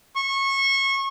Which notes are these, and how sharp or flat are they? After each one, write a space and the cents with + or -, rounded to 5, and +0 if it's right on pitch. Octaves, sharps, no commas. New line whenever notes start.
C#6 -25